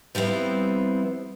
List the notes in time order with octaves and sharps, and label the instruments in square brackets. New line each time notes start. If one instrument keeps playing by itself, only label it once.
[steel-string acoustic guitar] F3 G3 B3 C4 E4